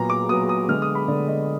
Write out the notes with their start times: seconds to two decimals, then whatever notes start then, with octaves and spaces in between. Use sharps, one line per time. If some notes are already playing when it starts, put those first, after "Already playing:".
Already playing: A#2 F#3 B3 A#5
0.10 D6
0.29 A#2 F#3 B3 D#6
0.49 D#6
0.68 D3 G#3 B3 F6
0.82 D#6
0.95 B5
1.08 D3 G#3 B3 D5
1.28 D#5